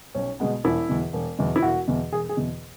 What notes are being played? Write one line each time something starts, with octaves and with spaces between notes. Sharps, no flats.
B1 C#4
B2 G#3 B3
E1 E4
E2 B2
E1
E2 B2
E4
E1 F#4
E2 B2
E1 G#4
G#4
E2 B2